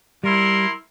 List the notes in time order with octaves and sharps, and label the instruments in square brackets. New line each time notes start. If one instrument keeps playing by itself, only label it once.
[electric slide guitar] G3 [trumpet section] E4 A#4 C6